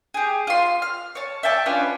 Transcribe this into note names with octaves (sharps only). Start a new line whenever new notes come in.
G4 G#4
F4 C6
F6
C#5 A5
E5 G5 A5 D6
C#4 D4 F4 B4